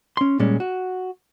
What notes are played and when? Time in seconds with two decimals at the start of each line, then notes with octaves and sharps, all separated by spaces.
0.17 C#4 C6
0.39 A#2 G3 G#3 C#4
0.60 F#4